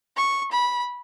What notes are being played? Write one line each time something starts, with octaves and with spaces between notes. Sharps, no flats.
C#6
B5